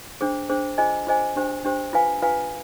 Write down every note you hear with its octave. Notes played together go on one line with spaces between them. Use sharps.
D4 G#4 C5
D4 G#4 C5
F4 G#4 C5 D#5 G#5
F4 G#4 C5 D#5 G#5
D4 G4 C5
D4 G4 C5
F4 B4 F5 G#5
F4 B4 F5 G#5